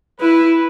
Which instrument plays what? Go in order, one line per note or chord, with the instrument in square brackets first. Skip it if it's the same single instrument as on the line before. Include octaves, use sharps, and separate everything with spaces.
[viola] E4 [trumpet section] B4